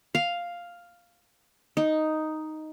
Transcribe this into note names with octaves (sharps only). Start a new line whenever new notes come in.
F5
D#4